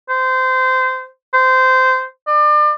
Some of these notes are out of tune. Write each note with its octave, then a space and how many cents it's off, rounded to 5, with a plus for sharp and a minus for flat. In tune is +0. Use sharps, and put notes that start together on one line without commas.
C5 -20
C5 -20
D5 +35